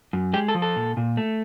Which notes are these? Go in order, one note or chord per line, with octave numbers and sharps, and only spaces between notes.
F#2
G#3 G4
A4
F3
A4
A#2
A#2
A3